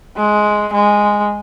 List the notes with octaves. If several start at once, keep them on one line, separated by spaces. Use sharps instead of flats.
G#3
G#3